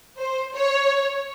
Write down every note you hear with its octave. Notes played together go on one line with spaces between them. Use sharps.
C5
C#5